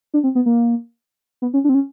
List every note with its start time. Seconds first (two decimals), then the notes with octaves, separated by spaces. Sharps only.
0.14 D4
0.24 C4
0.35 B3
0.46 A#3
1.42 B3
1.54 C#4
1.64 D4
1.69 C4
1.74 C#4